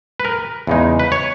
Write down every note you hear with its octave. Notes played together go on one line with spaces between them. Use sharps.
B4
A#4
E2 C#3 G#3 D#4
B4
C#5